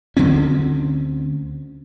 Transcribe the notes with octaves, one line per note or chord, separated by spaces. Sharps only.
D2 D3 C4 C#4